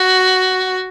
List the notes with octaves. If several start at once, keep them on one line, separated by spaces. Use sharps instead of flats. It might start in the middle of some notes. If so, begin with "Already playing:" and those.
Already playing: F#4